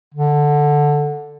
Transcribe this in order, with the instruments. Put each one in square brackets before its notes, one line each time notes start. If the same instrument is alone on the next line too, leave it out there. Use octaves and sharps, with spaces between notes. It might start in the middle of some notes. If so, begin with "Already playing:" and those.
[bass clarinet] D3